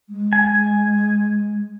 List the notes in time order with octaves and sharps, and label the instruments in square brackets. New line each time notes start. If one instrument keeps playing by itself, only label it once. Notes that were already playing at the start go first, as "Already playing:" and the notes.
[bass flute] G#3
[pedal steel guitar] G#5